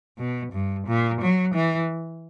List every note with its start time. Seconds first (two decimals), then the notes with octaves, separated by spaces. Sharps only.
0.18 B2
0.53 G2
0.87 A#2
1.21 F#3
1.55 E3